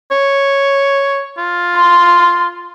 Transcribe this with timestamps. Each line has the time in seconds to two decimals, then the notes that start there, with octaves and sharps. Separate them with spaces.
0.11 C#5
1.38 F4
1.76 C6